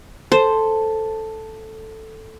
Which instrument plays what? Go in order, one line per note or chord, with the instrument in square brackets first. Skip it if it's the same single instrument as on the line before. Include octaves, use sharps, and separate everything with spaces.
[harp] A4 [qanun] C5